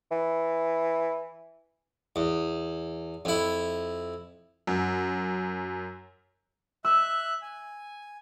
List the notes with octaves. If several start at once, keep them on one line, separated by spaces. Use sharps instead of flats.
E3
E2
F2 E4
F#2
E5 E6 F#6
G#5